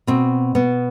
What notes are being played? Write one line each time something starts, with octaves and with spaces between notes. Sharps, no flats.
B2 C4
B2 B3